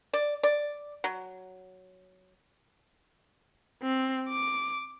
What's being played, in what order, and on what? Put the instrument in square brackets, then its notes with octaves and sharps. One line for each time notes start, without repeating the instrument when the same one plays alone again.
[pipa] D5
D5
F#3
[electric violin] C4
D6